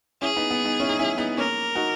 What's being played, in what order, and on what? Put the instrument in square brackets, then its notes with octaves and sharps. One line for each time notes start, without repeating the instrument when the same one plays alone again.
[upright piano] C#4 E4 [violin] G#4
[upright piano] B3 D#4
B3
B3 D#4
C#4 E4
D#4
C#4 E4
B3 D#4
[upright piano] A#3 C#4 [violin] A#4
[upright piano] D#4 F#4